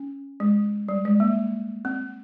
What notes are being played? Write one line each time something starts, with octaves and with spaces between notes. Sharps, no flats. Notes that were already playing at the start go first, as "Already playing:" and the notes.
Already playing: C#4
G#3
G3
G#3
A#3
C4